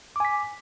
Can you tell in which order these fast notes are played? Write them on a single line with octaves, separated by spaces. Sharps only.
D6 G#5 B6